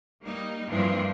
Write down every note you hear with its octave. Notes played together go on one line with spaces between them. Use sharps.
G3 A#3 D#4
G2 E3 F3 A#3 C4 D4